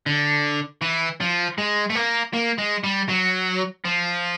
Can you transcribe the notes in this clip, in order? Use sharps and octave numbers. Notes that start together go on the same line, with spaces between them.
D3
E3
F3
G#3
A3
A#3
A#3
G#3
G3
F#3
F3